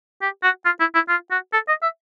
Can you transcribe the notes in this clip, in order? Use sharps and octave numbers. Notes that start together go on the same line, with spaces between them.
G4
F#4
F4
E4
E4
F4
F#4
A4
D#5
E5